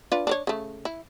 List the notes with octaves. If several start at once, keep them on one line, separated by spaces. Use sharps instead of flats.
D4 F4 B4
D4 A#4 C#5
C#3 A3
E4